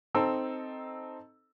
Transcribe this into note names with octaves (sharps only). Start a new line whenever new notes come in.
C4 D#4 A4 A#5 E6